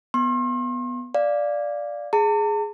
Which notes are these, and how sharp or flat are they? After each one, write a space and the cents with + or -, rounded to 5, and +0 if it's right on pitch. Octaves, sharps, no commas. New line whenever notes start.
B3 +0 C6 +40
D5 +0 F5 +0
G#4 +5 A5 +45